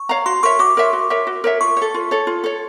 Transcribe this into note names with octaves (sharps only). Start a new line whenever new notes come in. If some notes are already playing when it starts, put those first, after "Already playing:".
Already playing: C#6
C#5 F5 A#5
F#4 C6
A#4 C#5 E5 C#6
F#4 D6
A#4 C#5 E5
F#4
A#4 C#5 E5
F#4
A#4 C#5 E5
F4 C#6
A4 C#5
F4
A4 C#5
F4
A4 C#5